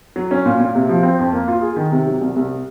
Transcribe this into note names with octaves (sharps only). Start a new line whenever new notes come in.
F#3
C#4
A#2
A#2
C3
F3
C4
F2
A#3
F4
G#4
D#3
C3
F#3
C2
C2